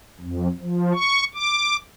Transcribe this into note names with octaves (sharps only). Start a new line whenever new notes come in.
F2
F3
C#6
D6